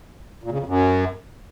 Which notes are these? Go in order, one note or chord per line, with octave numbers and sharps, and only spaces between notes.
A#2
C#3
F2
F#2